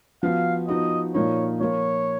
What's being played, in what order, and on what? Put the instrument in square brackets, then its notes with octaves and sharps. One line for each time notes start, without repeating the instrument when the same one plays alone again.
[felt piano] F3 B3 F#4 [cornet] F5
[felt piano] F3 B3 D#4 F#4 [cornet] D#5
[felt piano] A#2 F3 A#3 D#4 [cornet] C#5
[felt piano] F3 A#3 F4 [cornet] C#5